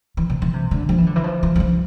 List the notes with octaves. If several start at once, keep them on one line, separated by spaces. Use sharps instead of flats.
E3
C3
E3
C3
D3
F3
E3
D3
E3
F3
F3
E3
F3